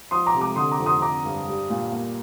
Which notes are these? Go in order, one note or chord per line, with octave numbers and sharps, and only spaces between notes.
F3 C6 D#6
A#5 D6
C3
A#5 D6
D3 C6 D#6
A#5 D6
F2
C6 D#6
D3 A#5 D6
G2
G3
A#2
A#3